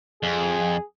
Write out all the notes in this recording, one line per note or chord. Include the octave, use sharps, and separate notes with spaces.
F2 G#4